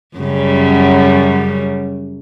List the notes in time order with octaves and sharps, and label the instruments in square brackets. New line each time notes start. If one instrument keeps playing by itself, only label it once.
[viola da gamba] F#2 C#3 G3